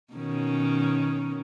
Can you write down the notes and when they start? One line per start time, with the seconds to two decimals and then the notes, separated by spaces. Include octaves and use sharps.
0.14 B2 D#3 C#4